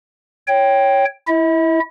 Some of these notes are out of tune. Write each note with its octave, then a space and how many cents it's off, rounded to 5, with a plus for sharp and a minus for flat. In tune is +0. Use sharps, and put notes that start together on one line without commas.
C#5 +0 G5 +0
E4 +0 E5 -45